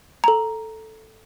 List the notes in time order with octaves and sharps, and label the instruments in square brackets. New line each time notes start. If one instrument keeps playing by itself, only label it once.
[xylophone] A4 A#5